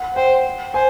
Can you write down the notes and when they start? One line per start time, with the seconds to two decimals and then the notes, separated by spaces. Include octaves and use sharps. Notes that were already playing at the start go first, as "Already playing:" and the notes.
Already playing: F#5
0.16 C5 G5
0.74 C5 G#5